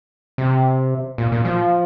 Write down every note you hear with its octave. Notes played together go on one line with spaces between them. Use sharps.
C3
A#2
A#2
F3